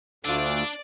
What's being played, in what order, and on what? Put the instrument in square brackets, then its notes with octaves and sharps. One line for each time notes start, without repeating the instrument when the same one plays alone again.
[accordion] D2 [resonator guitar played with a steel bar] D3 F4 [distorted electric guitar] D4 [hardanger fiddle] D5